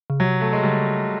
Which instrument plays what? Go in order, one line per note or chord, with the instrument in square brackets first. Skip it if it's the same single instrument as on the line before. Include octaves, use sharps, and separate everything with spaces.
[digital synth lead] C#3
[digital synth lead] C3 [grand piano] F#3
[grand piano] A3
G#3
[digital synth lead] C#3 [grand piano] G3